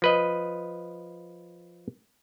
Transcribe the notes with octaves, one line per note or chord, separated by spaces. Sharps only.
F3 B4 D#5